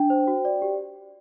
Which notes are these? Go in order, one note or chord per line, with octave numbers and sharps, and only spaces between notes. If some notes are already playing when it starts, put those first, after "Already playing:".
Already playing: D4 G5
C5
F#4
D5
G4